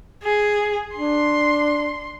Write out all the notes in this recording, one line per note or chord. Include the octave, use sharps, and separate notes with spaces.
G#4
D4 C6